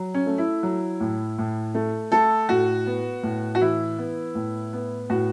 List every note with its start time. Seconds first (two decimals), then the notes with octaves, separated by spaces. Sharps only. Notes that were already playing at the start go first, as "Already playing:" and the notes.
Already playing: F#3
0.14 C#4
0.26 A3
0.38 E4
0.63 F#3
1.00 A2
1.38 A2
1.75 A3
2.12 A3 A4
2.49 A2 F#4
2.86 B3
3.23 A2
3.55 F#4
3.61 E3 E4
3.98 B3
4.35 A2
4.73 B3
5.10 A2 F#4